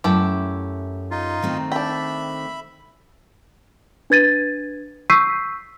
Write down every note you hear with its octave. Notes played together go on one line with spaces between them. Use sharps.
F#2 A3 E4 G4
D#4 F4
D#3 A3 C4
D4 E5 G5 B5
D4 B4 G#6 A6 D#7
C#6 E6 G6 B6 C7 D#7